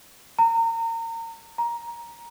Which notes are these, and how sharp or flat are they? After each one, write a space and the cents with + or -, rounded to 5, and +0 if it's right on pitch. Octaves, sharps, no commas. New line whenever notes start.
A#5 -30
A#5 +10